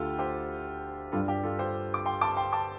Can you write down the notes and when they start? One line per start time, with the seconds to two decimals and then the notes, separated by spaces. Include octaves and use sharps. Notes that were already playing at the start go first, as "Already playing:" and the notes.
Already playing: D2 D3 A3 F4 G4 A4
0.19 G4 C5
1.12 G2 G3 D4 F4 A4
1.28 G4
1.43 F4 A4
1.59 G4 C5
1.94 D6
2.06 G5 C6
2.21 A5 D6
2.37 G5 C6
2.53 A5 D6